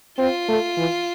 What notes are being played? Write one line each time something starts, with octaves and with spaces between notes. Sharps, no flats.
C4 F4
A3
E3